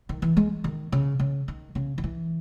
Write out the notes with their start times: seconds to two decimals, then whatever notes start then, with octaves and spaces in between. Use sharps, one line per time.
0.09 D#3
0.22 E3
0.37 G#3
0.64 D#3
0.92 C#3
1.19 C#3
1.48 D#3
1.75 C#3
1.98 D#3
2.04 E3